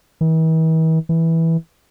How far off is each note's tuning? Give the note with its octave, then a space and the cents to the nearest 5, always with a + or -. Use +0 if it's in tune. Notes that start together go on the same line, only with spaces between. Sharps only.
E3 -45
E3 -10